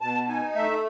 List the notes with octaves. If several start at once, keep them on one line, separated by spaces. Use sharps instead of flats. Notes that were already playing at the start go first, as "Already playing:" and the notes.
B2 A5
D#4 G#5
A3 E5